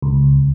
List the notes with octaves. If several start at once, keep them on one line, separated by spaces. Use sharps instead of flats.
C#2